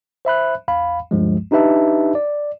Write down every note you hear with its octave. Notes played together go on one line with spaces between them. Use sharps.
C5 E5 B5 F#6
A#1 E2 F5 B5
D2 G2 F3 G#3
D4 D#4 G4 B4 E5 A5
D5